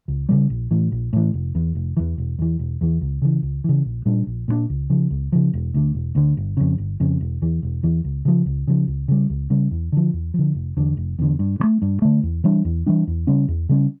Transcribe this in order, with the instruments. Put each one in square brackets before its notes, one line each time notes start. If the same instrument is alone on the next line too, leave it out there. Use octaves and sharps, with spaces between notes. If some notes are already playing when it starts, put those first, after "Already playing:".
[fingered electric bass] C#2
C#3 E3 G3
A#1
A2 E3
A#1
A2 E3
F1
E2 E3
F1
E2 E3
E1
E2 E3
E1
E2 E3
C#2
C#3 E3
C#2
C#3 E3
A#1
A#2 G3 D4
A#1
A#2 G3 D4
C#2
C#3 F3
C#2
C#3 F3
E1
D2 D3
E1
D2 D3
G1
F2 C#3
G1
F2 C#3
E1
E2 E3
E1
E2 E3
C#2
C#3 F3
C#2
C#3 F3
C#2
C#3 G3
C#2
C#3 G3
E2
D3 F3
E2
D3 F3
F1
E2 D3
F1
E2 D3
G2
D3
A3
G2
D3 A3
E2
E3 G3 D4
E2
E3 G3 D4
E2
C#3 G3 C#4
E2
C#3 G3 C#4